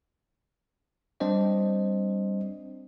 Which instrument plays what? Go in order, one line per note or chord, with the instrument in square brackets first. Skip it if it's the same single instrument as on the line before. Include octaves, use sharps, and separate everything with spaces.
[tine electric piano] G3 C4 D4 C5 D#5